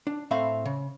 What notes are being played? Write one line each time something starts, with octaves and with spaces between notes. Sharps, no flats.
D4
A2 A3 C4 E5 F5 B5
C#3